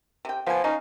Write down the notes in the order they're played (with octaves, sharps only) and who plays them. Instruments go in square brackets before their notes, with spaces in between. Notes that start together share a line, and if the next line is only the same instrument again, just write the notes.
[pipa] C3 G5
[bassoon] F3 [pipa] B3 G#5
[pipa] C#4 F5 [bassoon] D#4